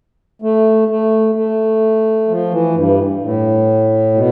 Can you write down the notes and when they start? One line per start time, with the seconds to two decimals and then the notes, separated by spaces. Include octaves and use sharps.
0.42 A3
0.88 A3
1.35 A3
2.28 F3
2.51 E3
2.75 G2
3.22 A2
4.14 B2